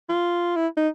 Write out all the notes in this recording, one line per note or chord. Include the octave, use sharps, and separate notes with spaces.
F4
E4
D#4